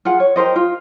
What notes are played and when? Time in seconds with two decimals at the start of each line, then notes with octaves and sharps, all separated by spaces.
0.05 F4 G#4 F#5
0.20 C#5
0.36 G4 A#4 C5 D#5
0.56 F4